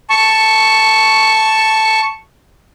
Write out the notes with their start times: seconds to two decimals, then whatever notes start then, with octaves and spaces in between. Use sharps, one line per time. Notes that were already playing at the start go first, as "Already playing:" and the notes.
0.10 A5 C#6